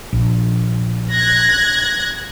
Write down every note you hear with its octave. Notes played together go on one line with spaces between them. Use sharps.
A#1
F#6 G#6 A#6